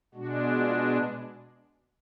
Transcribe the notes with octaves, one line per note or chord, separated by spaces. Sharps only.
B2 G#3 D4 F#4
F4